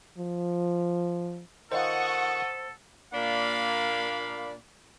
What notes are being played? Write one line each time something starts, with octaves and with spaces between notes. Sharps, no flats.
F3
D#3 F4 A4 C5 F#5 C#6 D#6
A#2 A#3 D4 D5 F5 B5